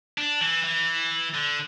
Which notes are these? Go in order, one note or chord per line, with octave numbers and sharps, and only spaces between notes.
D4
E3
E3
D3